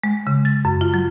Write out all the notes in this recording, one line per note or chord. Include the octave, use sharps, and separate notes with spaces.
G#3
C#3
A6
F#2
F4
F#3